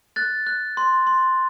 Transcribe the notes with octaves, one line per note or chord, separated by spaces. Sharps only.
F#6 A6
F#6
C6
C6